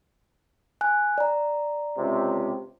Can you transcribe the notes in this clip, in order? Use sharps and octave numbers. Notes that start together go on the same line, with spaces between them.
G#5 F#6
D5 A#5
C#2 C3